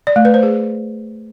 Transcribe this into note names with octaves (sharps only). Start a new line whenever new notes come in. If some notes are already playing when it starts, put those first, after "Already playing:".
D5
A3
B4
C5
G#4